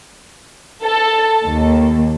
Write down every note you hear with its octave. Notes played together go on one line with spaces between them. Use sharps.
A4
D#2